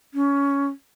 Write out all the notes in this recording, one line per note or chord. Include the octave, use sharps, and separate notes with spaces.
C#4